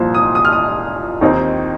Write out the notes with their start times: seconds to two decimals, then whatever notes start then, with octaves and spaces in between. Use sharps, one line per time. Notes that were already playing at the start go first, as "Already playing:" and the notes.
Already playing: C2 A#2 F3 C5
0.14 D#6
0.35 D#6
0.45 F6
0.52 D#6
1.21 D#2 D#3 C4 D#4